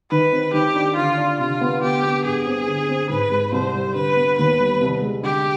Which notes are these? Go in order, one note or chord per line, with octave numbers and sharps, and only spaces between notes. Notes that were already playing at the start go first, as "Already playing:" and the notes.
D#3 B4
C4
D#3 G4
D4
D3 F4
D4
C3 F4
B3
D3 G4
B3
G2 G#4
C4
D3
C4
G#2 B4
G#3
C2 C5
G3
D3 B4
B3
D#2 B4
G3
C2
G#3
D3 G4